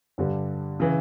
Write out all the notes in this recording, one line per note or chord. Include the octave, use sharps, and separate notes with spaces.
G2 D3 G3
C#3 E3